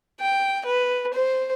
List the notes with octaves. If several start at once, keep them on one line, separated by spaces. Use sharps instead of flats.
G5
B4
C5